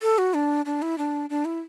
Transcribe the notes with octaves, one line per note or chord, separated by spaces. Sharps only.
A4
F#4
D4
D4
E4
D4
D4
E4